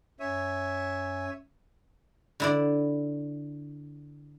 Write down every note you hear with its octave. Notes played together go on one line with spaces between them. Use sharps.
F#2 C#5 E5 G#5
D3 E4 D5